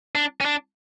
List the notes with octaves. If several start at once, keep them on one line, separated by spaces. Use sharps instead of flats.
D4
C#4
D4